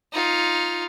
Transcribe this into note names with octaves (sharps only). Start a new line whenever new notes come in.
D#4 F4